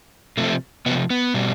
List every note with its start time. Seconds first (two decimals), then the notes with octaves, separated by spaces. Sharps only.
0.37 C3 F3 A3
0.86 C3 B3
0.89 F3
1.10 B3
1.34 B2 G3